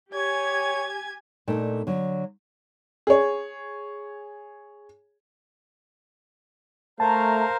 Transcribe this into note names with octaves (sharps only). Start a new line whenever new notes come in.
G4 C#5 G#5 G#6
A#2 A3 D4 D#4
D3 F#3
G#4 C#5
A3 A#4 C5 F5 A5 A#5